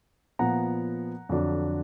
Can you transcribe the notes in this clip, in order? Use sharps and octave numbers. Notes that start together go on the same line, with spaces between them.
A#2 F3 B3 F#5 A#5
F2 D3 F#3 D4